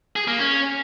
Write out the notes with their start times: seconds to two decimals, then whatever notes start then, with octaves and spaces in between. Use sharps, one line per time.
0.16 G#4
0.27 A#3
0.39 C#4